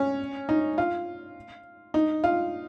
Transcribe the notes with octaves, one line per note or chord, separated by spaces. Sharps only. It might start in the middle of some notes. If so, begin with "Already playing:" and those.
Already playing: C#4
D#4
F4
D#4
F4